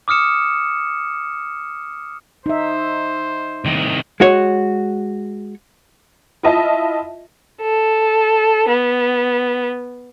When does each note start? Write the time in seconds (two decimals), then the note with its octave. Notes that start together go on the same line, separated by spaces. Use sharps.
0.08 D6 D#6 F6 C#7 E7
2.46 D#4 C5 E5
3.65 C2 D#3
4.20 G#3 F#4 C#5
6.43 E4 F4 D#5 E5 A5
7.62 A4
8.68 B3